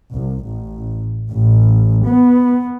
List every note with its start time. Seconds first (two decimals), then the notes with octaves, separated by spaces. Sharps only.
0.11 C2
0.42 A1
1.32 A1
2.04 B3